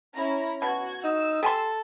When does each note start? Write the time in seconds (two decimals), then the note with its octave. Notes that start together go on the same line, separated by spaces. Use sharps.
0.14 C#4 E4 A#5
0.62 B2 F#4 G#6
1.04 D#4 E6
1.43 G4 A4 G#5 C6